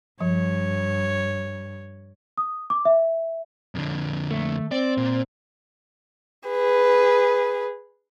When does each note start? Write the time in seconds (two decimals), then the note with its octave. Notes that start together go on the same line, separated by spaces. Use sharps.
0.21 G2 F3 C#5
2.38 D#6
2.70 D6
2.85 E5
3.75 F2 D3
4.31 A3
4.72 C4 D5
4.97 A#2
6.49 G#4 B4